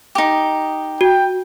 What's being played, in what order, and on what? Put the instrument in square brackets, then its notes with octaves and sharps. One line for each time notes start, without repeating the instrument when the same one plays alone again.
[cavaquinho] D#4 G4
[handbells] F#4 [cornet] G5